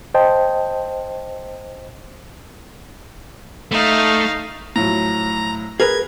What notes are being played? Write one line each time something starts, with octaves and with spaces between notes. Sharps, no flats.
C5 D#5 G5 A5
A3 D#4 F5
A2 F3 F#3 A#5
G#4 A#4 B4 G#6